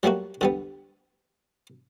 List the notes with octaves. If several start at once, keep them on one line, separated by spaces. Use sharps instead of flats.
F#3 G3 A3 A#3 F#4
D3 G3 B3